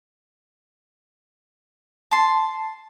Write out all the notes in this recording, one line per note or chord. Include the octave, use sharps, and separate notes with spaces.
A5 C6